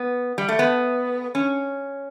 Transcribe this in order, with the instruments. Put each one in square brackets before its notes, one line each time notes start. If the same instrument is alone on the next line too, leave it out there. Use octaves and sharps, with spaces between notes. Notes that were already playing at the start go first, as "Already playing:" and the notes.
Already playing: [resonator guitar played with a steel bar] B3
G3
A3
B3
C#4